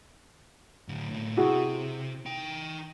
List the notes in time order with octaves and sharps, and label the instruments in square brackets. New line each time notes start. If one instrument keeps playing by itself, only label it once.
[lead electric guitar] A2 D3
A2 F4
[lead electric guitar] C3 [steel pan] E4 F#4 G#4
[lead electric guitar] D#4 G5